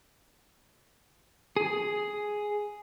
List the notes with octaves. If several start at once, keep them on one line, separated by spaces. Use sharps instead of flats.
G#4